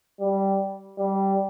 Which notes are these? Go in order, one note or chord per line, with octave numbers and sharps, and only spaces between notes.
G3
G3